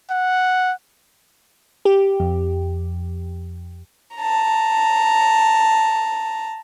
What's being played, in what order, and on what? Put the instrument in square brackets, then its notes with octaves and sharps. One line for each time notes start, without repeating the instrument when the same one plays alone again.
[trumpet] F#5
[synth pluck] G4
F2
[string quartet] A5 A#5